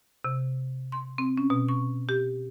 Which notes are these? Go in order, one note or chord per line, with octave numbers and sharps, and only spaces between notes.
C3
C6
C4
C#4
B2
C#6
G4